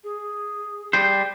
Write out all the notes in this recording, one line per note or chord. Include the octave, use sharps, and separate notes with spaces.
G#4
G3 C5